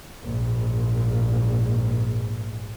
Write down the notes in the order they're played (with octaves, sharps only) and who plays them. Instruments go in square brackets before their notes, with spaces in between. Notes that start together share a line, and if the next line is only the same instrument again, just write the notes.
[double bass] A#1 G#2